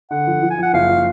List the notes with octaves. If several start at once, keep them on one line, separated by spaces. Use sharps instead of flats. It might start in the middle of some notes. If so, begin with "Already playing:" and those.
D3 F#5
F3
F3
G#5
F3 F#5
F#1 F5
F3